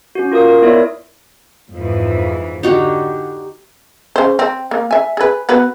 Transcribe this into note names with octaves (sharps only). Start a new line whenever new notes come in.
C#4 F#4
F4 A#4 F5 D#6
A#4
B3 E4 C#5 D5 E5
F2 G#2 E3
D3 D#4 F#4 G4
C#3 C5
C4
A#3
E5 G#5
G#4 B4
B3 F#4 B4